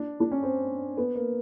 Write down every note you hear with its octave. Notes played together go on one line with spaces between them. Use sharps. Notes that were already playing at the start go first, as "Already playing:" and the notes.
Already playing: D4
D4
C#4
C4
B3
A#3